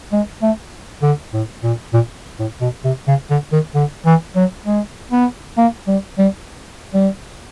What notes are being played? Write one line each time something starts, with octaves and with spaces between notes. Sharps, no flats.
G#3
A3
D3
A2
A#2
A#2
A2
B2
C3
C#3
D3
D#3
D3
E3
F#3
G#3
B3
A#3
G3
G3
G3